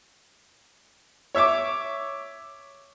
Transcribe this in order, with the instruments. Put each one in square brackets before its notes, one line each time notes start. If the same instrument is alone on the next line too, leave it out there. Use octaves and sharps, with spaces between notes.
[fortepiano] C#5 E5 C#6 D6